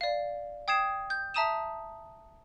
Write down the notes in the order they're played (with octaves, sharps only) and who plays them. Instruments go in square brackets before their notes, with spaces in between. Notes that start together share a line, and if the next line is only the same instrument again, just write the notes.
[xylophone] D5 F5
G5 D#6 G#6 C7 E7
G6
E5 A5 A#5 D#6 D#7 E7